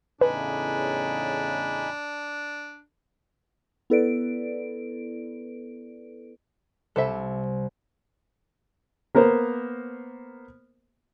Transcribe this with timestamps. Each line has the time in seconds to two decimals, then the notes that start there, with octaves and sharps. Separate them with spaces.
0.21 E2 A2 C#3 D4 D#4 B4 G#5 B5
3.90 B3 E4 A4 B4 D5 D7
6.96 C2 A4 C5 E5
9.15 A#3 B3 A#4 C5